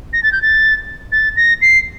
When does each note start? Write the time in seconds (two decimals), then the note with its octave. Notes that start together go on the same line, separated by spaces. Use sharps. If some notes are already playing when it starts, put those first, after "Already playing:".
0.13 A#6
0.23 A6
0.32 G6
0.42 A6
1.12 A6
1.37 A#6
1.62 C7